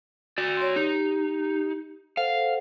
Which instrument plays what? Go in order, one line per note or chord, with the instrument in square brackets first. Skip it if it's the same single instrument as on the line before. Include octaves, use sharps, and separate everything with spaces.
[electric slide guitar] F#4 D5
[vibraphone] C#5 C6
[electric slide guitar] D#4 [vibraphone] G4
[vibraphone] A4 C5 F#5 [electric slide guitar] F5